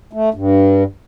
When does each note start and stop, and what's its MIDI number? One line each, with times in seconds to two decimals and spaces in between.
0.13 0.29 57
0.34 0.83 43